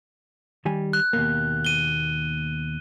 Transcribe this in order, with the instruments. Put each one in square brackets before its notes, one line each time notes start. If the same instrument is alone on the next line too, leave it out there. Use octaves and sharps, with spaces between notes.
[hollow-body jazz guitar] D#3 G3 G#5
[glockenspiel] F#6
[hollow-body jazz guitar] D#2 B2 A#3
[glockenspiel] D#7 G7